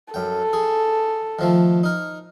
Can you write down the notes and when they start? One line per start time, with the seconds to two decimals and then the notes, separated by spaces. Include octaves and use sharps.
0.14 F#2 A4 G5
0.53 G#4
1.39 D#3 F3 A3
1.83 D#4 A#4